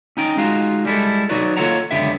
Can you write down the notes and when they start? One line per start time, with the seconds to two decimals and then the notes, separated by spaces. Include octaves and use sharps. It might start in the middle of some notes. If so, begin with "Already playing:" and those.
0.17 C#4 D#4 G5
0.37 G#3 D#4 F4 F#4
0.85 G3 G#3 E4 A4
1.29 F#3 D#4 F#4 B4 D5
1.57 A#3 F4 A4 C#5 F#5 A#5
1.91 C#2 F#2 D3 B3 G4 E5